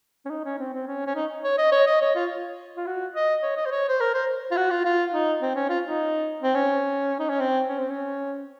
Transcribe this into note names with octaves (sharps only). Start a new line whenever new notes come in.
C#4
D#4
C#4
C4
C4
C#4
C#4
D#4
C#5
D#5
C#5
D#5
C#5
F4
F4
F#4
D#5
C#5
D#5
C5
C#5
C5
A#4
C5
F4
F#4
F4
F4
D#4
C4
C#4
F4
D#4
C4
C#4
D#4
C#4
C4
C#4
C4
C#4